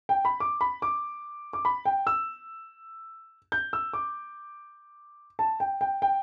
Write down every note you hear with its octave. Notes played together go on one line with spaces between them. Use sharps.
G5
B5
D6
B5
D6
D6
B5
G5
E6
G6
E6
D6
A5
G5
G5
G5